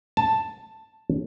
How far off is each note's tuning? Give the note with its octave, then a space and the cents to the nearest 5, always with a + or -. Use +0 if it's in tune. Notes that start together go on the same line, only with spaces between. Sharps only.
A5 +5